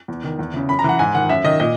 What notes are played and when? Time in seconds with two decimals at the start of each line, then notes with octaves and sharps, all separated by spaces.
0.08 E2
0.24 D#3
0.39 E2
0.54 C#3 E3
0.69 F#2 B5
0.79 A#5
0.84 E3 F#5
0.99 G#2 G#5
1.15 D#3 F#5
1.29 F#2 E5
1.44 D#3 D#5
1.60 A#2 D#5